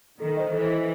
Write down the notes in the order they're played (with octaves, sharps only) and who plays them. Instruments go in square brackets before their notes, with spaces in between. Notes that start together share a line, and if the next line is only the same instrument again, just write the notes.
[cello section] D#3 [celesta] A4
[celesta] C5 D#5
[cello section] E3 [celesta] A4
[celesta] C5 D#5